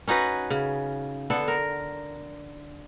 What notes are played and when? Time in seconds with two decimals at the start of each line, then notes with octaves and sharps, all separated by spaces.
0.08 C#4 D#4 F#4 B4
0.50 C#3
1.30 D3 B3 A4
1.48 A#4